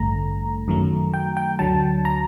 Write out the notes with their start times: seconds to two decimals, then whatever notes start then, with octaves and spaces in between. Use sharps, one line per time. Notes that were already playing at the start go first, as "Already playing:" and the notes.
Already playing: A1 G2 D3 A3 A#5
0.68 F#2 D#3 F#3 A3
1.14 G5
1.37 G5
1.59 D2 D3 F#3 A5
2.05 A#5